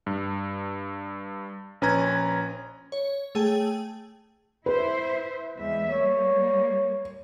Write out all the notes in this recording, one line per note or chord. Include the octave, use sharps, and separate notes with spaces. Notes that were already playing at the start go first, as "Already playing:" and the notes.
G2
A#1 C#4 B4 A#5 G#6
C#5
A3 G#4 G5 A5
E4 B4 C5 E5
E2 G#3 E5
G3 A#3 C#5